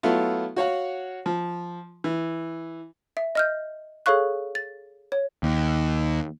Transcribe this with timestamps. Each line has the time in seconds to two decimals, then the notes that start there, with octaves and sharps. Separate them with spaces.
0.03 F#3 A3 B3 E4 F4
0.56 F#4 C#5 F5 F#5
1.26 F3
2.04 E3
3.17 E5
3.35 D#5 F6 G6
4.06 G#4 A4 C#5 F5 C#6 F#6
4.55 A6
5.12 C#5
5.43 D#2